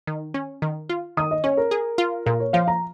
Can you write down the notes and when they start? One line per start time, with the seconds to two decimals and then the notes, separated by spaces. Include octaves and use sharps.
0.07 D#3
0.34 C#4
0.62 D#3
0.89 F4
1.17 D#3 D#6
1.31 D#5
1.44 C#4 C#5
1.57 A#4
1.71 G#4
1.98 F4
2.26 A#2 A#4
2.40 C#5
2.53 F3 F5
2.68 A#5